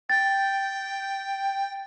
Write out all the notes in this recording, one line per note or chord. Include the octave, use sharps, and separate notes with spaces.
G5 A6